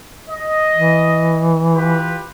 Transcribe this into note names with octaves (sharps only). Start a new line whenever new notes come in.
D#5
E3
F4 G4 B4